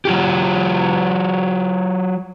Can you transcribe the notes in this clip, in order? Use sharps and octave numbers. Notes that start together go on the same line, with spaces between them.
F#3 F4 G4